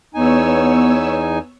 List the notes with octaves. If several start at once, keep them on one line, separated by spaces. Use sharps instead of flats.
E2 B3 D#4 C#5 G#5 E6